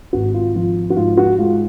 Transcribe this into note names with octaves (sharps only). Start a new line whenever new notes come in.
G#1 F#4
F4
F3 F4
F#4
G#2 F4
F#4
G#3 F4